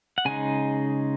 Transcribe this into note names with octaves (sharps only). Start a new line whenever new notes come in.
F#5
C#3 G#3 D#4 G#5